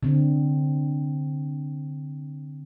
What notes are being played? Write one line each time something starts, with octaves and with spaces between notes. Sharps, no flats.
D3 C4